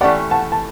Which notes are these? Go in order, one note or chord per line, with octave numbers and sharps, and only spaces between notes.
E3 A3 C#4 G4 D5 F#5
F#5 A5
A5